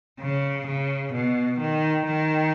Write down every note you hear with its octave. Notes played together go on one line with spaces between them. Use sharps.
C#3
C#3
B2
D#3
D#3